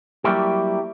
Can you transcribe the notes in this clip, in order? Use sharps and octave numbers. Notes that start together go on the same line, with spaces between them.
F#3 G3 A#3 E4 G4